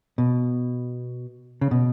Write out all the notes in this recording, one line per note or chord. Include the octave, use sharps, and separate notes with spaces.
B2
C#3
B2